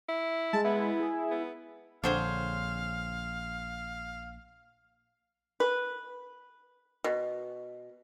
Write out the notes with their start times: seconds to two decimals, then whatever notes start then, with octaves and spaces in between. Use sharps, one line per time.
0.09 E4
0.53 G#3 A5
0.65 B3 E4
1.00 G#4
1.31 B3
2.04 A#1 D3 C4 G#4 C5 C#5 F5
5.60 B4
7.04 B2